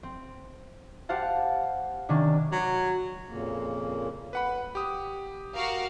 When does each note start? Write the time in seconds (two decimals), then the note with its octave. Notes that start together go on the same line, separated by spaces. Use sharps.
0.03 C4
1.09 G4 C5 F5 F#5 A5
2.09 C3 D#3 C#4 D4
2.52 F#3
3.28 F2 A#2 C#3 A#3
4.33 B4 F#5 B5
4.75 G4 D#6
5.55 F#4 A#4 F5